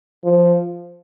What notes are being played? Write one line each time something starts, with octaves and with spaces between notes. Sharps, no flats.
F3